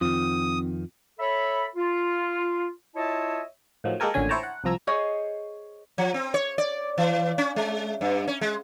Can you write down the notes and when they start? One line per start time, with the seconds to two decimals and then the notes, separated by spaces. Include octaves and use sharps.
0.01 F2 D#3 C4 F4 D#6
1.19 A4 C#5 E5 B5
1.75 F4
2.96 E4 F4 C#5 D#5 E5 A5
3.84 A2 D#3 F3 F#3
4.00 G#3 A#3 G4 A4 A#4 G#5
4.14 A1 D#2 A#2 D3 C#4 G#5
4.29 E4 C5 C#5 G5 A5 A#5
4.43 F#5
4.64 C2 F2 F3 A#5 E6 G#6
4.87 G#4 C5 C#5 D#5
5.98 F3
6.14 C4
6.34 C#5
6.58 D5
6.98 E3
7.38 C#4
7.56 G#3
8.01 G2
8.28 C#4
8.41 G#3